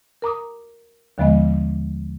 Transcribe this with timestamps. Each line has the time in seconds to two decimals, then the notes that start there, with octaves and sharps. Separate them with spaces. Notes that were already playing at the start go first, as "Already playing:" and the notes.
0.22 A#4 A#5 D6 D#6
1.18 D#2 D3 F3 G#3 B3 D#5